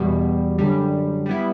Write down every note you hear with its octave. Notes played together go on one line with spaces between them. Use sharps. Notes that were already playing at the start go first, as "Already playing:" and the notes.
Already playing: E2 B2 G3
F#2 D3 G3
G3 B3 E4